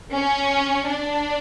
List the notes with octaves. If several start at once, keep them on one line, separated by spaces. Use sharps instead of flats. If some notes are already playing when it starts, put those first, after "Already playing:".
C#4
D4